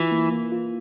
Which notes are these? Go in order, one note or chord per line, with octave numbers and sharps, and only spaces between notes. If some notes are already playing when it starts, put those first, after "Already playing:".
Already playing: E3 F4
A#3
A#3
F4